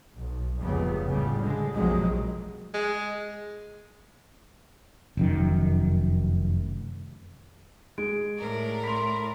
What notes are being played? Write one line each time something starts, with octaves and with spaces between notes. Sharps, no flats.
B1
F1 C#2 G2 C#3 G3 B3
C#2 A2 C#3 G3
D3 G#3
A#1 F2 C3 F#3 G#3
G#3
F1 F#2 D#3
G#3 D7
A2 A#4 D5
B5 C6 B6 F7